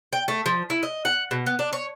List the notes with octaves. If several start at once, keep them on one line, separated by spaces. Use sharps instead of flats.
G5
A3
F3
E4
D#5
F#5
B2
B3
D4
C#5